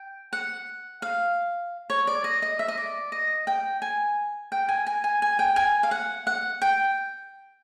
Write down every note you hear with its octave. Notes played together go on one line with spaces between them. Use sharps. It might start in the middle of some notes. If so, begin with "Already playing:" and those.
Already playing: G5
F#5
F5
C#5
D5
D#5
D#5
E5
D#5
D5
D#5
G5
G#5
G5
G#5
G#5
G#5
G#5
G5
G#5
F5
F#5
F#5
G5